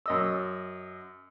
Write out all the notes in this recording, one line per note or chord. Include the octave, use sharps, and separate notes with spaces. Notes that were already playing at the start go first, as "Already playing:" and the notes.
F#2 D#5 E6